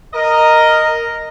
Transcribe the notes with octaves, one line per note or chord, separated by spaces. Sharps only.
A#4 D#5